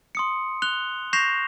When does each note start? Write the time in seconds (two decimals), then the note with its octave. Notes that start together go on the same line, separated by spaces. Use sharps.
0.15 C6 D#6 C#7
0.62 F#6 F7 G7
1.13 C#6 G6 A#6 C7 E7 F7